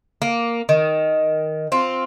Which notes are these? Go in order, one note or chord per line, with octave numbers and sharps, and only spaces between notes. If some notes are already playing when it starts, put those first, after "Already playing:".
A#3
D#3
C4 F4